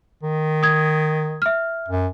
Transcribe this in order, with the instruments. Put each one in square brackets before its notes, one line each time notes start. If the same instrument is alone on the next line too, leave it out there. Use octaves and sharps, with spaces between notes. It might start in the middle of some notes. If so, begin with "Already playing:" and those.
[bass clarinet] D#3
[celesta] D#6 G#6
E5 F6
[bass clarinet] F#2